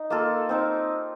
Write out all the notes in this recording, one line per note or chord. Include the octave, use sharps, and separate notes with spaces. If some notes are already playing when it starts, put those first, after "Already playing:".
Already playing: D#4
A#3 F4 A4
C4 D#4 A#4